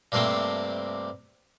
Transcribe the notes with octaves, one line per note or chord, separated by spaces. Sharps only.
G2 C3 A3 A#3 C4 G4